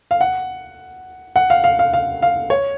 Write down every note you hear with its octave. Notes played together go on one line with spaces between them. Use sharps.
F5
F#5
F#5
F5
F5
F5
F5
F5
C#5